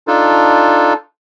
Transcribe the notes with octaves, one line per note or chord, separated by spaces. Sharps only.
D4 D#4 F4 A4